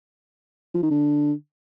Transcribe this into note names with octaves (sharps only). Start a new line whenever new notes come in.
F3
D#3
D3